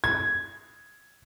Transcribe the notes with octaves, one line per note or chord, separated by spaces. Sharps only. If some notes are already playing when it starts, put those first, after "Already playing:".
G#6